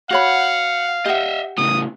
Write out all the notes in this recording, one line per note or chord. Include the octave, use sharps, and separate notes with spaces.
F#4 C#5 F5 F#5 B5
G4 D#5 E5 F#5
A2 C#3 D#6